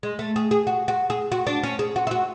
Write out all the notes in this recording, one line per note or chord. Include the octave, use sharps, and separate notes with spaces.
G#3
A3
G#4
G#4
F#4
F#4
G#4
F#4
D4
C#4
G#4
F#4
E4
F#4